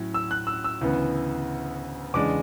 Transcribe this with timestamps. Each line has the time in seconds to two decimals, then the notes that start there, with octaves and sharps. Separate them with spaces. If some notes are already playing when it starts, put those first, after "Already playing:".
Already playing: A2 F#3 C#4
0.14 E6
0.31 F#6
0.47 E6
0.64 E6
0.81 D2 C#3 E3 B3
2.14 E2 C#3 G#3 D4 D6